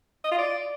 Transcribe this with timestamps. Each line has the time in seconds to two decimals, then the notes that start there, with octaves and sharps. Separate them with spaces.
0.24 D#5
0.31 F4
0.39 D5